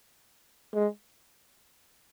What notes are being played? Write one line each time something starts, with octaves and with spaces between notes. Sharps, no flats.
G#3